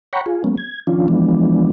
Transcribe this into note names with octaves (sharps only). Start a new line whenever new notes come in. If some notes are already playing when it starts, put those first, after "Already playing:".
C#5 F#5 G5 A#5 B5 C#6
F4 G#4
F#3 G#3 A#3 B3 C#4
G#6
D#3 F3 C#4 D4 F4
E3 F3 G#3 B3 D4